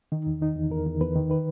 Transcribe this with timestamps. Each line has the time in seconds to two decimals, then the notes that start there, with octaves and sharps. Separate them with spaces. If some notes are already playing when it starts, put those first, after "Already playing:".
0.12 D#3 D#4
0.27 E2
0.41 D#3 D#4
0.56 E2
0.71 E2 A#4
0.86 E2
1.00 E2 B4
1.16 D#3
1.30 D#3 B4